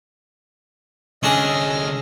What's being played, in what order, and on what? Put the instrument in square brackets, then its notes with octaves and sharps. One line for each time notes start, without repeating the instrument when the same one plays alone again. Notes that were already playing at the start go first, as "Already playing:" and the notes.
[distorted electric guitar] C2 D3 [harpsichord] C#4 D4 G#4 [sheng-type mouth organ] D#5 E6 F6